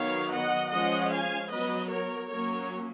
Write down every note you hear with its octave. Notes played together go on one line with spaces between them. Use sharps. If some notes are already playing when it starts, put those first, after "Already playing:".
Already playing: D#3 F#3 B3 C#5 F5
D#5 F#5
F3 G#3 C#4 D#5 F#5
F5 G#5
F#3 B3 B4 D#5
A#4 C#5
F#3 A#3 C#4 A#4 C#5